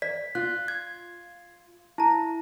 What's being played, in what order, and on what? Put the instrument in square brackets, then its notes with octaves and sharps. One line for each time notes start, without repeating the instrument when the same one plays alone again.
[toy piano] D5 [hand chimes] B6
[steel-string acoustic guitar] F4 [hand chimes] F#6
[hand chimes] G#6
[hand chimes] E4 [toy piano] A5 A#5